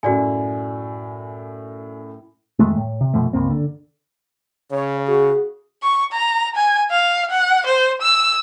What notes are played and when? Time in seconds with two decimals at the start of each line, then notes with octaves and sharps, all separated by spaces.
0.03 F#2 A2 F#4 D5 G#5
2.59 F2 D#3 G#3 A3
2.77 A2
3.01 C3
3.14 F#2 B2 F3 A3
3.33 C#2 G2 A#3 C4
3.50 D3
4.72 C#3 C#5
5.08 F#4 G#4
5.83 C#6
6.12 A#5
6.56 G#5
6.91 F5
7.31 F#5
7.66 C5
8.02 E6